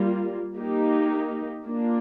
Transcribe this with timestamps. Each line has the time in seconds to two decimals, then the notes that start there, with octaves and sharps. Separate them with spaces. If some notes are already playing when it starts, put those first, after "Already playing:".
Already playing: G3 A#3 F4
0.57 A#3 D#4 G4
1.65 A#3 D4 F4